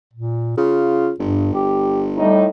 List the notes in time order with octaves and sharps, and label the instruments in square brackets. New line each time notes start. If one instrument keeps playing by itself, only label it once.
[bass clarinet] A#2
[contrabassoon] C#3 [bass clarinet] F4
[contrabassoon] G1 [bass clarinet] G2
[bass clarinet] G4
[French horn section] A2 D#4 [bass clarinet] G3